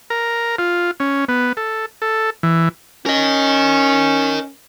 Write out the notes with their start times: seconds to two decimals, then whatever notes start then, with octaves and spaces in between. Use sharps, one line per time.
0.10 A#4
0.59 F4
1.00 C#4
1.28 B3
1.57 A4
2.02 A4
2.43 E3
3.06 C#4 A#4 D#5